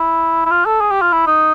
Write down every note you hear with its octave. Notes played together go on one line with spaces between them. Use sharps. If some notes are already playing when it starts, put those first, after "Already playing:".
Already playing: E4
E4
F4
A4
G#4
G4
F4
E4
D#4